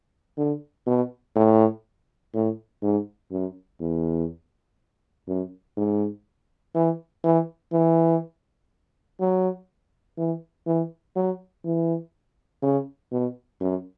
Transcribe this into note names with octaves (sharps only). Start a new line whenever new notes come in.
D3
B2
A2
A2
G#2
F#2
E2
F#2
G#2
E3
E3
E3
F#3
E3
E3
F#3
E3
C#3
B2
F#2